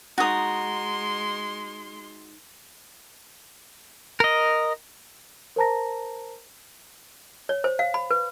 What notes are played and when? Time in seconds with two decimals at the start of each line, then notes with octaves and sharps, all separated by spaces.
0.18 G#3 D#4 F#4 A#5 C6 D#6
4.20 A#4 D#5
5.56 A#4 C5 A5 A#5 A#6
7.49 C#5
7.64 C5
7.79 F5
7.94 B5
8.11 B4